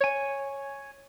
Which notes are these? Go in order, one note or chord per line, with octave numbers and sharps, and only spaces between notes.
C#5 G#5